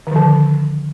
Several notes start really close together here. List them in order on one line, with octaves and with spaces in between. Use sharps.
D#3 F3 D3